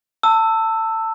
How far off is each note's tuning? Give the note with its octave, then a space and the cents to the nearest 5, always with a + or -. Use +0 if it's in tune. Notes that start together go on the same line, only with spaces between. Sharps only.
A5 +25 E6 +0